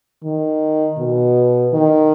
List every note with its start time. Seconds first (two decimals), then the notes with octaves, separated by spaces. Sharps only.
0.23 D#3
0.98 B2
1.73 D#3